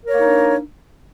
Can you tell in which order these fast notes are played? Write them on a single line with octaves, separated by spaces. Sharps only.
A#4 C#5 A#3 D#4 D4